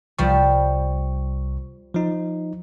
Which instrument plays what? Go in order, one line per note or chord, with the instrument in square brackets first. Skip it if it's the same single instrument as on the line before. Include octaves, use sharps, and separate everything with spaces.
[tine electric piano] C2 C#6 [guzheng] F3 G3
[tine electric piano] F3 D#4